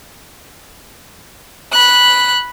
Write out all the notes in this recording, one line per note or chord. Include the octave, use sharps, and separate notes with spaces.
B5 F#6